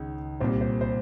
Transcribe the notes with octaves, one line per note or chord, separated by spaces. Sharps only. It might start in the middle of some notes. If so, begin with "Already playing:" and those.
Already playing: C#2 D#3
C2 A#2 C5
C5
C5